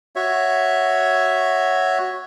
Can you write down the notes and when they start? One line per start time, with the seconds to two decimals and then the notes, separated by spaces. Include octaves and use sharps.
0.16 F#4 C#5 E5